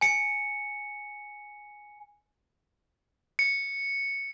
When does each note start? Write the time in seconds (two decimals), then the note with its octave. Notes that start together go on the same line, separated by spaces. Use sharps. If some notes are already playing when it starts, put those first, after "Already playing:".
0.01 G#5 C#7
3.39 C#7